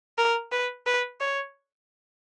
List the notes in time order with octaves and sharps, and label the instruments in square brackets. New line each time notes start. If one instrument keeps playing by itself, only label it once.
[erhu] A#4
B4
B4
C#5